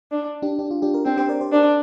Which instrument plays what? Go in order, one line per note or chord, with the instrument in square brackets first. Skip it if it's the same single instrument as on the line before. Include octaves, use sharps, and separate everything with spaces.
[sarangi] D4
[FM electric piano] D4 G4
D4 G4
F4
D4 G4
A#4
[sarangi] C4 [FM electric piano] D4 G4
[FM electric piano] G4 C5
A#4 D5
G4 C5
[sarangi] D4 [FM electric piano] A#4 D5